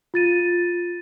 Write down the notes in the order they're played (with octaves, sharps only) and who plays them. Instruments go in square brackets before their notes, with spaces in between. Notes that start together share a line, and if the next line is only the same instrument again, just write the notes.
[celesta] F4 A6 D#7